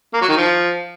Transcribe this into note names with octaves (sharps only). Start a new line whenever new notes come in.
A#3
F#3
D#3
F3